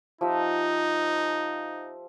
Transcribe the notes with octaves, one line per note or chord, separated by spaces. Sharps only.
F3 D#4 G4 E5